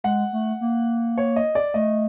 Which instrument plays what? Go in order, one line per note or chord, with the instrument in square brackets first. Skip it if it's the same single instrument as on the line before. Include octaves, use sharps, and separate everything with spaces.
[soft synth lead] G#3 [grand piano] F#5
[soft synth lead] A3
A#3
[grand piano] C#5
D#5
D5
[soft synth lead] A3 [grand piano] D#5